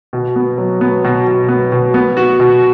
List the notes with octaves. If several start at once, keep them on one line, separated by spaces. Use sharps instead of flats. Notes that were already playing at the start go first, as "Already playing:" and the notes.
B2
B3
F#3
B3
B2
B2
B3
B2
B3
F#4
B2